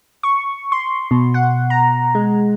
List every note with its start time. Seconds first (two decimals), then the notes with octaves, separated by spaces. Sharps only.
0.23 C#6
0.72 C6
1.11 B2
1.34 F#5
1.70 A#5
2.15 G#3